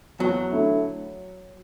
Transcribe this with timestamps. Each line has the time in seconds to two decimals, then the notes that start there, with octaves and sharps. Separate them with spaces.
0.19 E2 F#3
0.51 D3 A3 E4